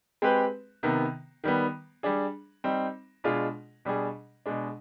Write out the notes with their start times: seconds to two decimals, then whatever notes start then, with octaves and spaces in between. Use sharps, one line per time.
0.22 G#3 C4 G4 B4
0.83 C3 D#3 B3
1.44 D#3 G3 B3
2.03 G3 D4 G#4
2.64 G3 C4 D#4
3.24 B2 G#3 D4 F4 G#4
3.85 B2 G3 D4 G#4
4.46 B2 G#3 D4